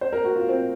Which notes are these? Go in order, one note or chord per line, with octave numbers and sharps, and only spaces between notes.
C5
A#4
F#4
F4
C4